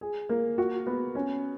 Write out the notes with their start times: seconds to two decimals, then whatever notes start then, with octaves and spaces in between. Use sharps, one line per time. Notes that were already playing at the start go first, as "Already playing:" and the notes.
0.01 G#4
0.29 A#3
0.58 F#4
0.87 B3
1.15 C#4